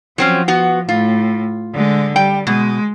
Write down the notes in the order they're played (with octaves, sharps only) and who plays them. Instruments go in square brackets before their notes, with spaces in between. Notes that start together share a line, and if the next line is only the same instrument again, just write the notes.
[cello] F3 [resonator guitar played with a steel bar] F#3 C4 C#4
[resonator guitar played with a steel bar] B3 F#4
[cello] A2 [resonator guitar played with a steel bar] F4
[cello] D3 G#3
[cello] G3 [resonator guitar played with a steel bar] G5
[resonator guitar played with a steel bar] B2 [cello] G#3